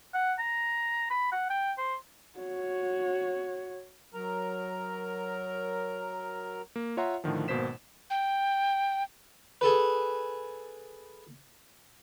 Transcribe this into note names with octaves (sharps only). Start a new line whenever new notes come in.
F#5
A#5
B5
F#5
G5
C5
F#4 C#5
F#3 A#4 A#5
A#3
F4 C#5 E5 F#5 A#5 C6
A2 D3 D#3 F3
G#1 B2 A#3 C5 B6 E7
G5
G#4 A4 B4